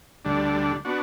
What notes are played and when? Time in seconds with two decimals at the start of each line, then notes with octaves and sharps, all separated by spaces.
0.25 D2 D3 G3 D4
0.85 B3 D4 F#4